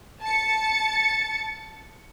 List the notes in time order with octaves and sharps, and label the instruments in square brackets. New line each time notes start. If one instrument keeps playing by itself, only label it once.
[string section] A5 A6 C#7